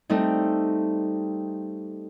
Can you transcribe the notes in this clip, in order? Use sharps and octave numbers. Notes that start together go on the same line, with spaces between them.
G3 A3 C4 D#4